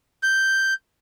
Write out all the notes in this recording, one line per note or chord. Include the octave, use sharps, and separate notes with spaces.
G6